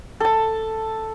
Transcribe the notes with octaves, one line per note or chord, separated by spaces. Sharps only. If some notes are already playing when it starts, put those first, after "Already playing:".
A4 A5